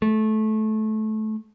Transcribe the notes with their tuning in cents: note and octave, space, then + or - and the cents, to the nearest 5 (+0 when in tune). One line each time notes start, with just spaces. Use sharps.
A3 -20